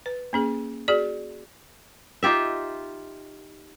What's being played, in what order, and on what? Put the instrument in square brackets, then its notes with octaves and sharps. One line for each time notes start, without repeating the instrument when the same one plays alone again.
[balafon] B4
A#3 C#4 G#4
F#4 G#4 D5
[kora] D#4 F4 G4 E5